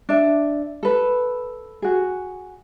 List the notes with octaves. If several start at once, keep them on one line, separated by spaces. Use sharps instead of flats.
D4 E5
A4 B4
F#4 G#4